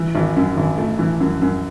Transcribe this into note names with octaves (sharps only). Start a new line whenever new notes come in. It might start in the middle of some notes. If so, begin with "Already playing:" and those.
Already playing: E3
G#1
F#2
G#1
A3
E3
F#2
F#2